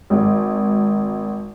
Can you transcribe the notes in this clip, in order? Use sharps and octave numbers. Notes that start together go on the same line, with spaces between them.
G#1